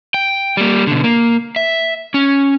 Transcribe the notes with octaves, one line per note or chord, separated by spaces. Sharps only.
G5
G3 A#3
B2 D3
A#3
E5
C#4